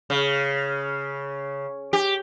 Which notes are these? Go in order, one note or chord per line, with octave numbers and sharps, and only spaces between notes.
C#3
G4